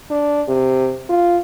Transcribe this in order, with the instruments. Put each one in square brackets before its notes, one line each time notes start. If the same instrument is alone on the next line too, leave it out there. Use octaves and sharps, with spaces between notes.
[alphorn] D4
C3
F4